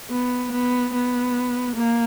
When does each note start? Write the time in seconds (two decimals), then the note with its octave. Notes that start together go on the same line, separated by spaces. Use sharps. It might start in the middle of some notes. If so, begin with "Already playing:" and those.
0.10 B3
0.52 B3
0.93 B3
1.75 A#3